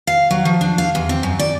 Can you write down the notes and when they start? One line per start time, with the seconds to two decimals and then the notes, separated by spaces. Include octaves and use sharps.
0.07 F5
0.31 F#3
0.45 F3
0.61 D4
0.78 F5
0.95 E2
1.09 C4
1.23 F#2
1.39 D5